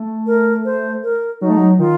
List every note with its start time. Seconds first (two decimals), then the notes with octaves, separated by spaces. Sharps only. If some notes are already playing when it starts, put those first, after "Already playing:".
Already playing: A3
0.27 A#4
0.65 C5
1.04 A#4
1.41 F#3 D#4
1.50 A3
1.57 F#3
1.79 D#3 F4